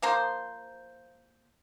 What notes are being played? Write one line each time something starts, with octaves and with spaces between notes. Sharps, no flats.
F3 A#3 C5